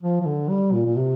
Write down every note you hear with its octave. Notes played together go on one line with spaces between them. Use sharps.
F3
F3
D3
G3
A#2
A#2
C3